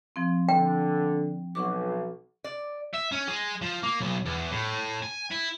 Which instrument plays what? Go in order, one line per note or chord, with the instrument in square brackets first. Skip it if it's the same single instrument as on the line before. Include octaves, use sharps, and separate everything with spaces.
[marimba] F3 C4
[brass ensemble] D3 [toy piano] G5
[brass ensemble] B1 [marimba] F#5 C#6 D6
[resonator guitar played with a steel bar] D5
[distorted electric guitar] E5
C#4
G#3
F3
A#3
B1
E2
A2
G#5
E4